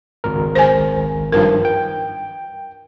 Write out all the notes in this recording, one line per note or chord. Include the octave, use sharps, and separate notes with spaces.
G#1 C#2 A#4
C5 G#5
G2 D#3 F3 A#4
G5